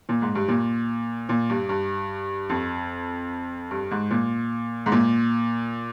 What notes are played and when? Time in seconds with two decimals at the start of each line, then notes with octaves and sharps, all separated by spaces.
0.09 A#2
0.22 G#2
0.35 G2
0.48 A#2
1.29 A#2
1.50 G2
1.69 G2
2.50 F2
3.71 G2
3.91 G#2
4.11 A#2
4.86 G#2
4.92 A#2